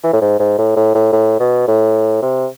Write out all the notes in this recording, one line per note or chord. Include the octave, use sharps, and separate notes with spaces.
E3
A2
G#2
G#2
A2
A2
A2
A2
B2
A2
C3